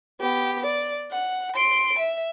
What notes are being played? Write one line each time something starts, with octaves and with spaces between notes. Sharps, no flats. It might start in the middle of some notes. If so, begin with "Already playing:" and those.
B3 G4
D5
F#5
C6 D7
E5